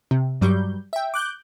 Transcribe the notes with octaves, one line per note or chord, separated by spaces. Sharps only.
C3
G2 F#3 G3 G6
E5 G5
D6 F#6 G6